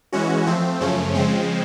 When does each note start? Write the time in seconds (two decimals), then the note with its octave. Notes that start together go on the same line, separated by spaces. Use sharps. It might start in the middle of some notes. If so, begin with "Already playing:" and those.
0.13 E3 G#3 C#4 F#4
0.46 F3 A3 C4
0.80 F#2 C#3 F3 A3 C#4
1.15 C#3 F3 G#3 C4